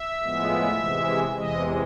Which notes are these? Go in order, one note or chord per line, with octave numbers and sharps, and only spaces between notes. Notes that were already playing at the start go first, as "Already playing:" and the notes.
Already playing: E5
A2 F3 G#3 B3
C3 E3 G#3
E2 C3 E3 G#3 D#5